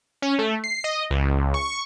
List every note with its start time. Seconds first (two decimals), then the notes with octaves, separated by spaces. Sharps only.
0.22 C#4
0.39 A3
0.64 C7
0.84 D#5
1.11 C#2
1.54 C#6